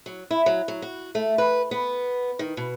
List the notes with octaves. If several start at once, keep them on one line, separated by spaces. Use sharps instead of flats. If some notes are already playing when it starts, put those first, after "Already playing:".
F#3
E4
F#3
F#3
F#4
A3
B4
B3
D#3
B2